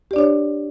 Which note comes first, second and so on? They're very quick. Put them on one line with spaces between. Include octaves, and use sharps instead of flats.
G4 D5 D4 C#5